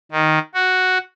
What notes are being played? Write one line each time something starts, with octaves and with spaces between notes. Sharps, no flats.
D#3
F#4